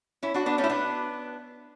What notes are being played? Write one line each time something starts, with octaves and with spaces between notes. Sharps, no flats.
C#4 E4
D4 F#4
B3 D4
A3 C#4
E4
B3 D4